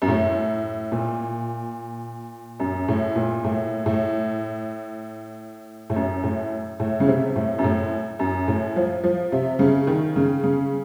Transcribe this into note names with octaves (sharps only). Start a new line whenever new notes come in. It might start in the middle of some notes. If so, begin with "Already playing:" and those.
F#2
A2
A#2
F#2
A2
A#2
A2
A2
A2
F#2
A2
A2
C#3
C3
A2
F#2
A2
F#2
A2
F3
F3
C3
C#3
D#3
C#3
C#3